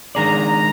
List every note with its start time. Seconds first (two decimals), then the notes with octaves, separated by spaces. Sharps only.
0.15 D#3 G#3 D4 G#4 D5 A#5